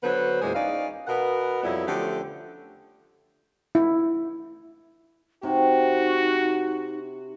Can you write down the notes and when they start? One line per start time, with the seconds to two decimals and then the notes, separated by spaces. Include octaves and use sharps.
0.03 D3 F#3 B3 B4 C5
0.42 E2 A#2 G#3 G#4 C5
0.55 C#4 D#4 D5 F5
1.08 B2 B3 A#4 F#5
1.63 F2 F#3 G3 B3 E4
1.86 D3 F3 A3 C#4 G4
3.75 E4
5.43 C3 D#4 F#4